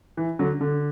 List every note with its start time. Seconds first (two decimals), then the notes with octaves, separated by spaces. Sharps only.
0.17 E3
0.39 D3 F#3
0.61 D3